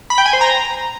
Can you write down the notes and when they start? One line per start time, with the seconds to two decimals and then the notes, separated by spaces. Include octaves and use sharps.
0.10 B5
0.18 G5
0.26 G#5
0.33 C5
0.41 A#5